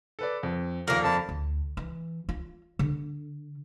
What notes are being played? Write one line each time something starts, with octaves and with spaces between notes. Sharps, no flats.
A4 B4 D5
F2
D#2 D3 F3 A#3 A#4
F2 A5 B5
D2
E3
F4
D3